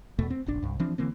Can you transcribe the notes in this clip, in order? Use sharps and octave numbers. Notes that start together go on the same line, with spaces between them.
E2 B2 A3
C4
F1 A#1 D4
C2 G2
E3 F3 C4 D4
D3 E3 A#3 C4